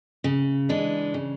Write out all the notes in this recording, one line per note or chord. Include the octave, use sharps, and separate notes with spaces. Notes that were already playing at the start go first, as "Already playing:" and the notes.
C#3
E3 G#3 D4
C#3